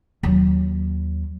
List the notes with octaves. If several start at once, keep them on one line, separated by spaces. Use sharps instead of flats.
D#2 F#3